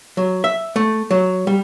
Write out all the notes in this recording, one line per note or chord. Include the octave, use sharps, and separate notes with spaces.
F#3
E5
A3
F#3
G3